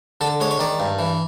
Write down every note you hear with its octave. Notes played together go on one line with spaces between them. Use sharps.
D3 A4
G#3 C#5
C#5
D#3 D5
G2
E3